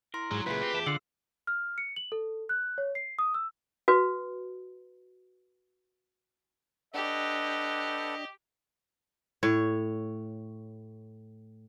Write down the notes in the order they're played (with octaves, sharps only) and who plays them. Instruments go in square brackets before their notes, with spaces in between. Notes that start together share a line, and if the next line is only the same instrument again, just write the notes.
[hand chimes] E4 A#5 C6 [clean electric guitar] A#4
[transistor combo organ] G#2 [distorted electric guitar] F#3
[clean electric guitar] C#2 A#2 [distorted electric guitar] F#2 [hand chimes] F4 G#4 [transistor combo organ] B4
[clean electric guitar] A3 C4 [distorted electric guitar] G4
[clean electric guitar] E2 E5 A5
[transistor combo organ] D3 [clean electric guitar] F4 F5 F#5 [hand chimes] E6
[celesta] F6
C#7
F#7
A4
F#6
C#5
C7
D#6
E6
[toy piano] F#4 B4
[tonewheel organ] D4 G6 [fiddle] G4 [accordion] A4 B4 F#5 [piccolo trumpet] D#5
[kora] A2 C#5